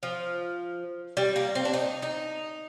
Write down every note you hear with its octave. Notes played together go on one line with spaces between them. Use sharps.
F3
G3
A#3
C4
D4
D#4
D#4